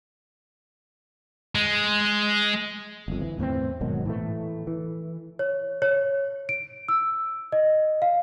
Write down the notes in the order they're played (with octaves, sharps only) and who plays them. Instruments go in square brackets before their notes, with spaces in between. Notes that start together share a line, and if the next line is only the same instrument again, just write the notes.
[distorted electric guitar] G#3
[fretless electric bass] G1 F2
E3
E2 A2 E3 C4
G#2 B2 D#3 F#3
A2 E3 A3
E3
[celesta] C#5
C#5
D7
E6
D#5
F5